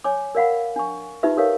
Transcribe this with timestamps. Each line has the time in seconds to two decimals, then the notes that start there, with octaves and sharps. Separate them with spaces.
0.04 C#5 G#5 D6
0.35 A#4 D5 F5 F#5 B5
0.76 D4 C#6
1.23 D#4 F4 G4 B4 E5
1.37 G4 A4 A#4 C#5 F5